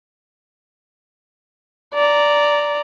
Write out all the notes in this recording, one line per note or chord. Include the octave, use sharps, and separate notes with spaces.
D5 A#5